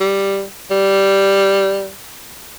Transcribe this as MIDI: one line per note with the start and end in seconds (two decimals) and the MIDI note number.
0.01 0.44 55
0.71 1.91 55